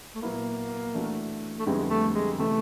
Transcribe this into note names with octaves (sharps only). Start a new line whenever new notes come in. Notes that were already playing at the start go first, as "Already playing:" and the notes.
A3
A#2 F#3 A#3 B3 E4
E3 A3 D4 F#4
A3
F2 D3 G3 G#3 B3 E4
A3
G#3
C3 E3 A3